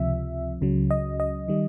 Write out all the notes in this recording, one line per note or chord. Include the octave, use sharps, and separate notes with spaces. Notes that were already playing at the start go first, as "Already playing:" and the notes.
Already playing: C#2 C3 F3 E5
C#2 C#3 F#3
D#5
D#5
D#3 G3